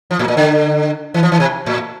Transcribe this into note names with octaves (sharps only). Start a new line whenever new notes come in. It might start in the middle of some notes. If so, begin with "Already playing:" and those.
F3
A2
A#2
D3
E3
F3
E3
C3
A2